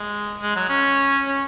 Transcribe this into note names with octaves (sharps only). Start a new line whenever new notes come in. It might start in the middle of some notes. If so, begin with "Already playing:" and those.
Already playing: G#3
G#3
F#3
C#4
C#4